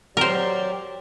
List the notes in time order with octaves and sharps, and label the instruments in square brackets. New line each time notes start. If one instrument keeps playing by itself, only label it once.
[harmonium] F#3 G4 D5 [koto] A#4 C5